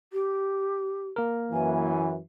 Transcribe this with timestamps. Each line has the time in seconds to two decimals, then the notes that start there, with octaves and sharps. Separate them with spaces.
0.12 G4
1.16 A#3 A#4
1.52 F#2 E3 G#5